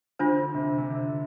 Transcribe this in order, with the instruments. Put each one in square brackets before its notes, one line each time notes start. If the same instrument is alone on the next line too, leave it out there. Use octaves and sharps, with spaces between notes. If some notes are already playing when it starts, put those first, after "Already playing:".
[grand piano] D3 [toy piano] D4 F4 C5
[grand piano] C3
C3
D3